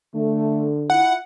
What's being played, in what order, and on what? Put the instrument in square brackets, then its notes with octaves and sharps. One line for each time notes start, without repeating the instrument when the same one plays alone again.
[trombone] D3 [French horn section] A3
[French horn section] E4 F4 [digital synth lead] F#5